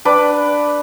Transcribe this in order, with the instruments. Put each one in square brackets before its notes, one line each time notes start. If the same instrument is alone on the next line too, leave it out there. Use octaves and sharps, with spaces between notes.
[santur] D4 B4 G5 D6